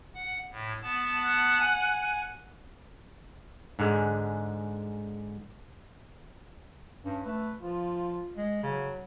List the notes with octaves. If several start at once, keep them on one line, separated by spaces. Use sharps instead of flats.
F#5
A2
B3 A5
F#5
G#5
G#2 D3 G#3
G2 C#4
A3 B4
F3 F4
G#3
C#3 F#3